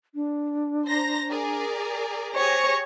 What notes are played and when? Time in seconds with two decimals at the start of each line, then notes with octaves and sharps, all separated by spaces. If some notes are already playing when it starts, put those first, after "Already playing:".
0.15 D4
0.87 C5 A#5 A#6
1.29 G#4 A#4 D5
2.35 G4 G#4 C5 C#5 A#6